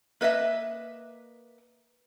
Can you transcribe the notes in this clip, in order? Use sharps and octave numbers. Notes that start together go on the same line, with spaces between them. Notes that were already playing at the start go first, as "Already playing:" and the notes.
A#3 B4 D#5 E5